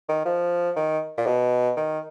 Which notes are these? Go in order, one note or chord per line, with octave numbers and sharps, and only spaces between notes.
D#3
F3
D#3
A#2
B2
D#3